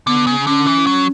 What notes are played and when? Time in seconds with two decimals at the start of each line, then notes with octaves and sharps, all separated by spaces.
0.07 D3 B3
0.27 C#3
0.47 D3 C#4
0.66 E3
0.87 F#3